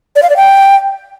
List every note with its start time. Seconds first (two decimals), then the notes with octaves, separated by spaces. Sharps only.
0.16 D5
0.23 F5
0.30 D5
0.36 G5